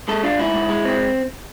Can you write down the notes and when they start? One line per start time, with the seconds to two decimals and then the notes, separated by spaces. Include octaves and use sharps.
0.08 G#3 A4
0.23 D4 F4
0.39 G#2 E4
0.54 G#2
0.69 G#3
0.85 C4